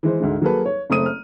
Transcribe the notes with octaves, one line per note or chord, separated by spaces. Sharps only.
E3 G#3 C5
D2 G#2 G#3
F#3 A#3 G#4 A4 B4
C#5
F#1 A3 C4 D#6 D#7
F6